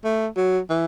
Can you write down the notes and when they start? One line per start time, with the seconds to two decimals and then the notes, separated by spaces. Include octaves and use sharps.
0.04 A3
0.37 F#3
0.70 E3